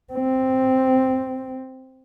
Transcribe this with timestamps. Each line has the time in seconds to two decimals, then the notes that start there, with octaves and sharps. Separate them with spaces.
0.13 C4